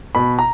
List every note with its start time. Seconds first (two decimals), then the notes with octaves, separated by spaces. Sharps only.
0.15 B2 B5
0.39 A#5